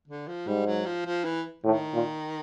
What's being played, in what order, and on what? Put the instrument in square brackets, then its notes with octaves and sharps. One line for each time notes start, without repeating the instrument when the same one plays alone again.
[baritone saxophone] D3
F3
[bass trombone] G#2 [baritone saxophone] G3
[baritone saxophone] F#3
F3
F3
E3
[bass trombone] A2 [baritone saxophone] D#3
[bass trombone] A#2